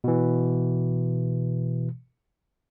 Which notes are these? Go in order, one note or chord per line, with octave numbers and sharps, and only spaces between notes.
B2 E3